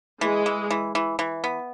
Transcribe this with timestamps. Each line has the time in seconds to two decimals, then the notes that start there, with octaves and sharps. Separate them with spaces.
0.21 E3 G#3
0.46 E3
0.70 E3
0.95 E3
1.19 E3
1.44 B3